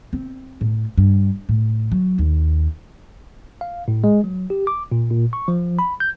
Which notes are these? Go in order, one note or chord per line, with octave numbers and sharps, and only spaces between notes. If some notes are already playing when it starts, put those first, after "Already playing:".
C4
A2
G2
A2
F#3
D#2
F5
A2
G#3
F#3
G4
D6
A#2
A#2
C#6
F3
B5
G6